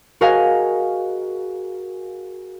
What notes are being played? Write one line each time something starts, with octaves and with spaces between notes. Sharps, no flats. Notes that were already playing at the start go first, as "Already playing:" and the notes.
F#4 G#4 A#4 D#5 F5 G#5